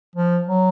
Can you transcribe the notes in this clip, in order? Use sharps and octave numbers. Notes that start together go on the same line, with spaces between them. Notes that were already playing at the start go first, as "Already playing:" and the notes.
F3
F#3